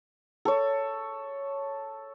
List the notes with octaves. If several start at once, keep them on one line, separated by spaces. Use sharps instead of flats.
A4 C#5